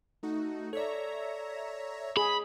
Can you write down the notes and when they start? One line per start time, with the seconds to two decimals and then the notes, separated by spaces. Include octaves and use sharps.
0.23 A3 D#4 F#4
0.73 A4 C#5 D5 E5 A#5
2.17 G#4 B5